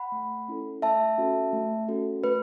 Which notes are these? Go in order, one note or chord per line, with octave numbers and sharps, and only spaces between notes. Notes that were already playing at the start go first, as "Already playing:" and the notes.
Already playing: F#5 B5
A3
C#4 E4 A4
A3 E5 A5
C#4 F#4 A4
A3
C#4 F#4 A4
A3 B4